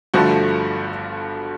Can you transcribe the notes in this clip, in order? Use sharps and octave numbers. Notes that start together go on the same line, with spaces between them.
G1 G2 D3 F3 A3 F#4